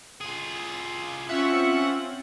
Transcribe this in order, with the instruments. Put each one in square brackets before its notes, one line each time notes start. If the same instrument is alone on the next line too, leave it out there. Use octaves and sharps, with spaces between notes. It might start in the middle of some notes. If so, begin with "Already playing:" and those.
[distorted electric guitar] F4 G#4
[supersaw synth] C4 C#4 F4 [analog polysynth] E5 C#6 [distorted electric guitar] F#5